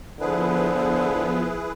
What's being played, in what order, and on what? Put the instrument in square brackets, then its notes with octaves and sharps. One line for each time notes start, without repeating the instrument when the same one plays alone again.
[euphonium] D3 [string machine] F3 B3 [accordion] E4 G#4 B4 [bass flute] C5